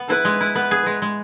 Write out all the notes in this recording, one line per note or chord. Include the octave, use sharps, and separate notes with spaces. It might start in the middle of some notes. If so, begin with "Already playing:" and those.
Already playing: B3
E4 B4
G#3
E4
B3 B4
G#4
G#3
G#3